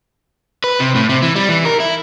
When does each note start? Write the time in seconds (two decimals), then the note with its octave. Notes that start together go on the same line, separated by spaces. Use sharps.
0.64 B4
0.80 C3
0.95 A2
1.09 C3
1.22 E3
1.36 G3
1.49 E3
1.65 A#4
1.80 E4